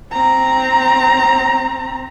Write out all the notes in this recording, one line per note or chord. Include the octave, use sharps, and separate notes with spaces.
C4 A#5